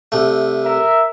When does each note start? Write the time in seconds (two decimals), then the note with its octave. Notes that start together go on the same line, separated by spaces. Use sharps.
0.12 C2 A3
0.64 A#4 E5